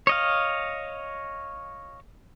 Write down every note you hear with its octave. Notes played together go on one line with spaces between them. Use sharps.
C#5 D#5 F5